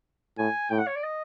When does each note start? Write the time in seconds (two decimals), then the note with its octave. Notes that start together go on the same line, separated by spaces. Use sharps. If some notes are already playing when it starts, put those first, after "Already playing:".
0.38 A2 G#5
0.70 A2 G5
0.78 F#5
0.87 C#5
0.96 D5
1.03 D#5